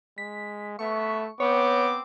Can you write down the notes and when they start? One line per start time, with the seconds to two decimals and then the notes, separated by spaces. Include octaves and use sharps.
0.18 G#3 B6
0.79 A3 B3 E5 C#6
1.40 B3 C4 C#5 D6